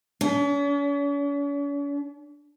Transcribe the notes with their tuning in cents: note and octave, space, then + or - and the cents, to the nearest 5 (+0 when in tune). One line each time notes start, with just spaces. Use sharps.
C#4 +45